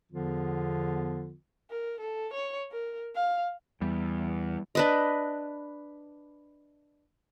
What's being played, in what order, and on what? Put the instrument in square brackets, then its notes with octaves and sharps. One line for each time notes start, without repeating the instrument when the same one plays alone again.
[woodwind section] E2 D3 F3 B3 F4
[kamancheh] A#4
A4
C#5
A#4
F5
[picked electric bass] E2 [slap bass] G3
[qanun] D4 B4 D#5